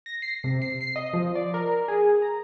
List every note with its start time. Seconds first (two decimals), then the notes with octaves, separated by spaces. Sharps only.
0.06 A#6
0.22 C7
0.44 C3
0.62 C7
0.81 C7
0.96 D#5
1.13 F3
1.35 D5
1.54 A#4
1.88 G#4
2.22 A#5